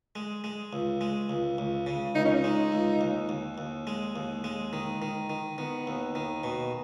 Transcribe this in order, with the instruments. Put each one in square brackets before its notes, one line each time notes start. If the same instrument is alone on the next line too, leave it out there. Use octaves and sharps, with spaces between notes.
[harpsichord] G#3
G#3
C#2
G#3
C#2
C#2
C#3
[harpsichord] C#2 [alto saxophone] D#4
[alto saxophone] C#4
D#4
[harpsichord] G#3
C#2
D#2
D#2
D#2
G#3
D#2
G#3
D#3
D#3
D#3
[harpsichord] D#3 [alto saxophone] B3
[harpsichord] D#2
D#3
B2